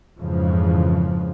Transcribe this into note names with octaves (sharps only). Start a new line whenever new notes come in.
F2 G#2 C#3 E3 F3